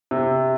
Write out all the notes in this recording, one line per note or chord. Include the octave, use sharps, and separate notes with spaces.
C3